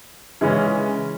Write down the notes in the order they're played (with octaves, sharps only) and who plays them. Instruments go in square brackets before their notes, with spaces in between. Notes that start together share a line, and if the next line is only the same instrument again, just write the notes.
[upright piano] C#3 E3 G#3 C#4